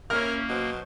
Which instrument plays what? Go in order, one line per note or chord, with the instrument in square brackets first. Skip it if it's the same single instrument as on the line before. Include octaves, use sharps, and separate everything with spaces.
[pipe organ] A#3 [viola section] C#4 E4 [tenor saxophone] A#4 [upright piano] F6
[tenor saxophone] B2 [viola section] F#3 C5